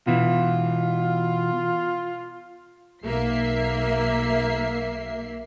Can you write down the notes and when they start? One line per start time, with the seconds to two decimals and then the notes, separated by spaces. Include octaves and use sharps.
0.07 B2 E3 F4
3.04 B1 A#3 E5 C7